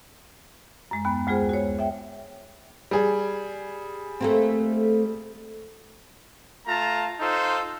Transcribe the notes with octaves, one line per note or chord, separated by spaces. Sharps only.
F#2 G#3
D#2 B3 B5
D2 G#3 F4 G#4 C5
F#4 C#5
E5 G5
G3 G#4
A3 A#3 C4
A3 F4 A5 A#5
D#4 F4 A4 C5